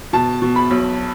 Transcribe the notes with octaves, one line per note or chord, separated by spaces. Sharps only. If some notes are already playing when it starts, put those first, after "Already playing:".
B2 A5
B2
B5
B1